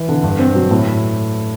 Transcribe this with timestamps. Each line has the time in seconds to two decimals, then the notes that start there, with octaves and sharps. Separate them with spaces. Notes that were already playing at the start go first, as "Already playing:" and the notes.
Already playing: E3
0.09 D3
0.23 G2
0.39 C4
0.55 F#3
0.71 A2